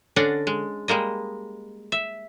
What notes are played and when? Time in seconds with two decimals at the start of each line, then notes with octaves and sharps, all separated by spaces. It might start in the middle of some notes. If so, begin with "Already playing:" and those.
0.16 D3 C#4 D4 D5 D#5 F#5
0.47 G#3
0.88 G3 G#3 A#3 D#5
1.92 E5